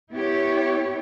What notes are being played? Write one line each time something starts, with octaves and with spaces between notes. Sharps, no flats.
B3 E4 G4 C#5